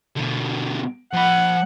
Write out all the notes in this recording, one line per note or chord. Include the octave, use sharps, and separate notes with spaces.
B2 D3
F3 F#5 B5